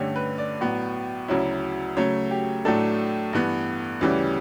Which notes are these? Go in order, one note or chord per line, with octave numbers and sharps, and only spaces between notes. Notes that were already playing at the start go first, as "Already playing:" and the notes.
Already playing: G2 D3 A3 C#4 G4
B4
D5
A2 F#3 B3
D2 C#3 F#3 C#4 E4
C#3 F#3 A3 C#5
G4
A2 F#3 A3 D4 A4
G2 E3 B3
D2 C#3 E3 G3 C#4